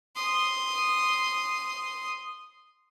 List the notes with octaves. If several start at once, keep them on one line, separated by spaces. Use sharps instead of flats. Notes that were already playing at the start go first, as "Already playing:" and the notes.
C6 D#6